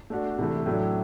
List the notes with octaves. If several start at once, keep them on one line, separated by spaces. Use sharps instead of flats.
A3 D4 F#4
C3 E3 A3
A2 F#3 A3 D4